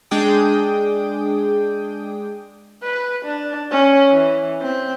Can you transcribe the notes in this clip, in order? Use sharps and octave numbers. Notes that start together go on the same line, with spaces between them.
G#3 D4 G#4 G5 D6 D#6
B4
D4
C#4
E3
C4